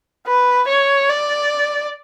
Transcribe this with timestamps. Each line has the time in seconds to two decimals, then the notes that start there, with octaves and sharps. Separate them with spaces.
0.27 B4
0.68 C#5
1.09 D5